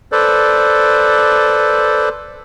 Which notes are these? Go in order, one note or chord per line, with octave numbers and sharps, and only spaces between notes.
A4 B4 C5 D5